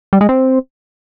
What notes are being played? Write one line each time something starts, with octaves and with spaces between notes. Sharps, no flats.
G3
G#3
C4